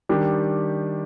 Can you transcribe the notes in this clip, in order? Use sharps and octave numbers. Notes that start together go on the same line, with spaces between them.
D#3 G3 D4 G4